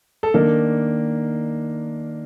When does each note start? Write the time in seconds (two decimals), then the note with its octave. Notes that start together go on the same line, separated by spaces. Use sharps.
0.23 A4
0.34 D#3 A#3 D4 A#4